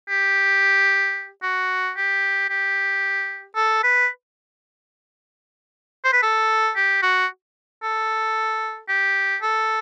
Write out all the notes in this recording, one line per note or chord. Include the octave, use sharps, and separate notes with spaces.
G4
F#4
G4
G4
A4
B4
C5
B4
A4
G4
F#4
A4
G4
A4